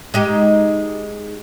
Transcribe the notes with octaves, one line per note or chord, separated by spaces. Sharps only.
G#3 D#4 G4